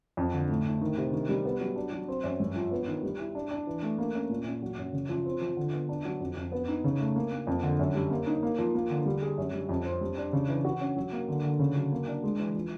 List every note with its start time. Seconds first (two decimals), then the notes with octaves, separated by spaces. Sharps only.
0.17 F2
0.33 D3
0.49 A2
0.66 A2
0.81 D#3
0.98 C3
1.13 D#3
1.29 G3
1.45 B3
1.60 F#3
1.76 D4
1.92 F#3
2.08 C4
2.24 F#2
2.40 G2
2.56 F3
2.71 B3
2.88 D#3
3.03 G3
3.19 E4
3.35 D4
3.51 D4
3.67 E3
3.82 A3
3.98 A#3
4.14 C#4
4.30 A#2
4.46 A#2
4.62 F#3
4.78 F#2
4.93 C#3
5.09 F3
5.25 C4
5.41 F3
5.57 D3
5.73 B3
5.89 D4
6.05 F#3
6.20 F2
6.36 F2
6.52 B3
6.68 D#4
6.84 C#3
7.00 A3
7.16 A#3
7.32 A#3
7.47 F2
7.63 D3
7.79 F#2
7.95 G3
8.11 A#3
8.27 D#4
8.43 A#3
8.58 F3
8.75 A#3
8.90 D3
9.06 G3
9.22 G#4
9.38 F#2
9.53 G3
9.69 F2
9.85 C4
10.01 G3
10.17 D4
10.33 C#3
10.48 E3
10.65 F#4
10.81 C#4
10.96 F#3
11.13 A#3
11.28 D3
11.44 D3
11.59 C#3
11.76 F#3
11.92 A#3
12.08 D4
12.24 G#3
12.39 E3
12.55 F3